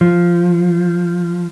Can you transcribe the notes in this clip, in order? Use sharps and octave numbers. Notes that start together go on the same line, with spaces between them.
F3